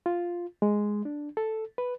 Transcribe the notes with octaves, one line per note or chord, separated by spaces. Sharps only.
F4
G#3
D4
A4
B4